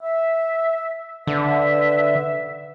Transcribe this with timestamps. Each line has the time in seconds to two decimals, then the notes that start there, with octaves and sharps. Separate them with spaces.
0.02 E5
1.27 D3 B4 E5